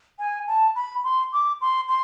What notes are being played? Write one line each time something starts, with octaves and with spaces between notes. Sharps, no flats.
G#5
A5
B5
C6
D6
C6
C6